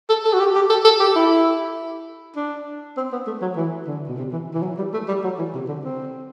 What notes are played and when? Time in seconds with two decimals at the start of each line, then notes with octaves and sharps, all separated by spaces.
0.09 A4
0.24 A4
0.33 F#4
0.39 G4
0.55 G4
0.70 A4
0.85 A4
1.00 G4
1.16 E4
2.36 D4
2.97 C4
3.12 B3
3.27 A3
3.42 F#3
3.56 E3
3.87 D3
4.09 B2
4.18 C3
4.33 E3
4.54 E3
4.62 F#3
4.78 G3
4.93 A3
5.08 G3
5.24 F#3
5.38 E3
5.54 C3
5.68 D3
5.84 C4